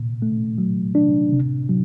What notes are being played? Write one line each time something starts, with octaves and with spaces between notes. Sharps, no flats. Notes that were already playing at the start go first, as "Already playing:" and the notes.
Already playing: A#2
A3
F#3
D4
C3
F#3